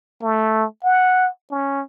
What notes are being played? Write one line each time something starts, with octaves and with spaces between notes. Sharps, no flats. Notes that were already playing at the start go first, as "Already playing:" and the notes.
A3
F#5
C#4